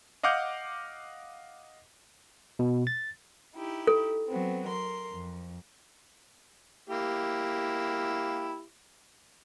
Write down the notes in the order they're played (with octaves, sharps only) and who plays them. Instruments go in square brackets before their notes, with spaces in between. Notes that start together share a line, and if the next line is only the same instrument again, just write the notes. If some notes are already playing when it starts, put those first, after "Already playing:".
[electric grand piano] D#5 F5 F#5 D6 F6 G6
[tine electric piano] B2
A6
[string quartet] D#4 E4 G4
[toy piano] A4
[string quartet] F#3 B3 C4
A#4 C6
F2
[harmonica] A#3 E4 G4